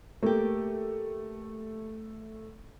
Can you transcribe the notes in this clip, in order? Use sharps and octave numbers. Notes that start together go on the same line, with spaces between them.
A3 A#3 G4